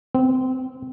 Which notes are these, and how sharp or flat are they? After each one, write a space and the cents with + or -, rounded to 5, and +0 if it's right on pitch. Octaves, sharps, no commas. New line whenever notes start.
C4 -20